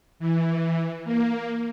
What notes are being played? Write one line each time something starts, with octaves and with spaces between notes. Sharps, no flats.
E3
A#3